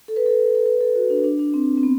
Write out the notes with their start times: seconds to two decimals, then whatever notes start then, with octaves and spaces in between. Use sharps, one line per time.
0.08 A4
0.16 B4
0.26 A4
0.55 A4
0.66 B4
0.81 A4
0.95 F#4
1.10 D4
1.24 D4
1.39 D4
1.54 C4
1.77 C4
1.83 B3